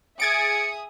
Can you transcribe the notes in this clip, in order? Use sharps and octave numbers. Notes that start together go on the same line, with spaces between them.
G#4 E5 D#6 G#6 A6 C#7 D7